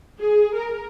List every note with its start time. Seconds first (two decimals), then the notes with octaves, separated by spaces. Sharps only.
0.20 G#4
0.56 A#4